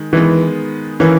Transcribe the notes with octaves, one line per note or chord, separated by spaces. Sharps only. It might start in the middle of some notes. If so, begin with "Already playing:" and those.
Already playing: D#3 G#3
D#3 E3 G#3 B3
D#3 E3 A#3 C#4 E4 A#4